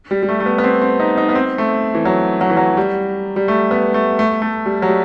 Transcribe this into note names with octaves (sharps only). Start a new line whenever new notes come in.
G3
G3
A3
A3
B3
B3
C4
C4
D#4
D#4
B3
C4
A3
E3
F#3
F#3
E3
F#3
G3
G3
A3
B3
A3
A3
A3
G3
F#3
G3